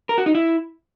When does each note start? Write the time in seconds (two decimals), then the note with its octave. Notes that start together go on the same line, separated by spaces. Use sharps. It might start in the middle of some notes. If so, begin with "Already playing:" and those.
0.09 A#4
0.18 F#4
0.26 D#4
0.35 E4